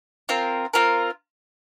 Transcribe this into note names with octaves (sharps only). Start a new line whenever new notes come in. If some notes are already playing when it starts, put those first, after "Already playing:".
C4 F4 A#4
C4 F4 A#4